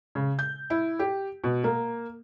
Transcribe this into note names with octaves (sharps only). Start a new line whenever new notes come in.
C#3
G6
E4
G4
B2
A#3